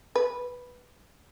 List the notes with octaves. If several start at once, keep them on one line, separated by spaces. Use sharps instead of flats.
B4